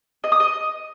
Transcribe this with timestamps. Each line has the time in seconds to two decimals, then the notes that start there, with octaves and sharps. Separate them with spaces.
0.24 D#5
0.32 D#6
0.40 D#5